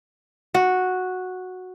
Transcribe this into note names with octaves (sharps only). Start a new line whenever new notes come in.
F#4